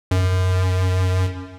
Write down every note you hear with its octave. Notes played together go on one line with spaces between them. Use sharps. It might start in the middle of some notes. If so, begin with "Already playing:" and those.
F#2